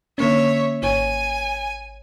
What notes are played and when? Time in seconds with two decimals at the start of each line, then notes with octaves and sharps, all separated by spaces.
0.18 D3 A#3 C#4 C#5 E5
0.83 G#1 C#5 G#5